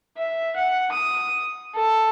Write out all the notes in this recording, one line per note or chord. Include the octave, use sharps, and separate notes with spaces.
E5
F#5
D#6
A4